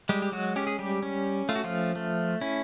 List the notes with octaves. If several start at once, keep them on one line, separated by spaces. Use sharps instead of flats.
G3 G#3 G4
G4
F#3 F#4
C#4 G4
G#4
G3 G4
C#4
A3 F4
F#4
F3 F4
A3
C#4 E4